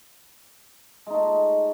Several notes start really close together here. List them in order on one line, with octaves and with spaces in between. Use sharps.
G#3 D#4 A3